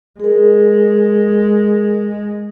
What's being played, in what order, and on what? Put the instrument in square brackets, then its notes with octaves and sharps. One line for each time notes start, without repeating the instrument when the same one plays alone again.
[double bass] G#3 [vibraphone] G#4 A#4